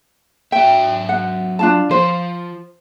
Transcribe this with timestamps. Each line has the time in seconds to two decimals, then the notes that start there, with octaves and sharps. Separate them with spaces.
0.52 F#3 E5 G5
1.09 F#5
1.59 D4 F4 A5
1.91 F3 C5